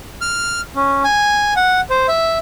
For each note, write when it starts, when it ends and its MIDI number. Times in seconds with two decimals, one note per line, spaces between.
0.21 0.61 89
0.75 1.03 61
1.04 1.54 80
1.56 1.81 78
1.90 2.07 72
2.08 2.38 76